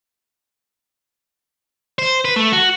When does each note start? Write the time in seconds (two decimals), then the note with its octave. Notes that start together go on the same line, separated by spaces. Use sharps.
1.99 C5
2.25 B4
2.36 A3
2.53 F#4